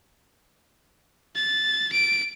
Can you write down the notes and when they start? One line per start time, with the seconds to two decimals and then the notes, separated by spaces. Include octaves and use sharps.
1.36 A6
1.92 D7